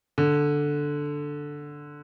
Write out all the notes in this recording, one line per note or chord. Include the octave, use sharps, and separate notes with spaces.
D3